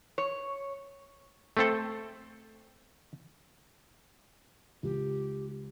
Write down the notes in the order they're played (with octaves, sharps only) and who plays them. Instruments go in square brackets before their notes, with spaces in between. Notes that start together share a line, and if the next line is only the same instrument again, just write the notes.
[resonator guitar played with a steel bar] C#5
[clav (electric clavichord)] A3 C4 A4
[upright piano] C#2 [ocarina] G4